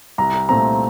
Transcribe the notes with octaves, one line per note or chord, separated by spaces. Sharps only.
C2 A#5
A#2 A3 C4 A#5